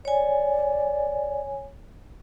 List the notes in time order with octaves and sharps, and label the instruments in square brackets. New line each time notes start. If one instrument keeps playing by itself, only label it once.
[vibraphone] C#5 G#5 [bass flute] D5